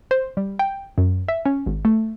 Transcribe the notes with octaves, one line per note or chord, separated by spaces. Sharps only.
C5
G3
G5
F#2
E5
C#4
G#1
A3